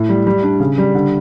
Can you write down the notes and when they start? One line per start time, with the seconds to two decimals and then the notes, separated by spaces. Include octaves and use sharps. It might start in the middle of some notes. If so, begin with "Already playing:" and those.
Already playing: A2
0.09 G3
0.27 G3
0.43 D4
0.60 C#3
0.78 G3
0.95 D3